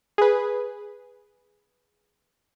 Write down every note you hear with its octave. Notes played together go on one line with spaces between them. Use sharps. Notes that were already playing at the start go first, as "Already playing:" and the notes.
G#4 B4